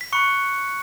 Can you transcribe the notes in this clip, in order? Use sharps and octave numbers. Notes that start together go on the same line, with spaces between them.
B6
B5 C#6 F#6 C#7